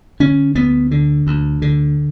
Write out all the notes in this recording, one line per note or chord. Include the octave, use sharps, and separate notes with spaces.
D3 C#4
D2 B3
D3
D2
D3